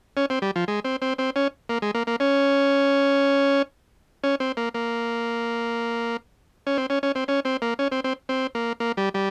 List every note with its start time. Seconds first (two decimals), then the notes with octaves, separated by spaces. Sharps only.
0.17 C#4
0.30 C4
0.42 G3
0.56 F3
0.68 G#3
0.84 C4
1.02 C4
1.18 C4
1.36 C#4
1.69 A#3
1.82 G#3
1.95 A#3
2.07 A#3
2.20 C#4
4.24 C#4
4.40 C4
4.57 A#3
4.74 A#3
6.67 C#4
6.77 C4
6.90 C#4
7.03 C#4
7.15 C4
7.28 C#4
7.45 C4
7.62 A#3
7.79 C#4
7.92 C4
8.04 C4
8.29 C4
8.55 A#3
8.80 A#3
8.97 G3
9.14 G3